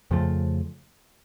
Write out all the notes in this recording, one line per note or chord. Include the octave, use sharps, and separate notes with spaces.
F2 C#3 F3 A3